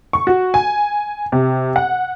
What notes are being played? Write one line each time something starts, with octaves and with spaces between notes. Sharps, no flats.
C#6
F#4
G#5
C3
F#5